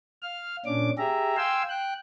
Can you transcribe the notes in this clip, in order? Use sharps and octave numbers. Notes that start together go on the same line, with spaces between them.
F5 F6
A#2 C#4 D4 D6
G4 G#4 E5 A#5
F5 G5 G#5 C6 E6
G5 F#6